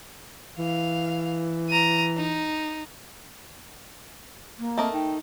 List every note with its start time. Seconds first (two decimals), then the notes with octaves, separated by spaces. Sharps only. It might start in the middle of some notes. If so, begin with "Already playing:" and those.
0.59 E3 F5
1.69 A#5 D#7
2.17 D#4
4.58 A#3
4.78 A3 C4 A#4 D#5
4.93 D#4 G5